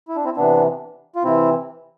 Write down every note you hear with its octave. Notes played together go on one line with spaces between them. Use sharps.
E4
D4
C4 E4
C3 E3 B3 D4
F4
C3 E3 C4 E4